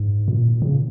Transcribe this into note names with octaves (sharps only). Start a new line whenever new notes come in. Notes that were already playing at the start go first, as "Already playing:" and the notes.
Already playing: G#2
A#2
C#3